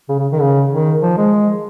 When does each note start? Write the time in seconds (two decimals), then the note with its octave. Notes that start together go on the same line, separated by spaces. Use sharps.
0.09 C#3
0.19 C#3
0.32 D#3
0.41 C#3
0.72 D#3
1.02 F3
1.17 G#3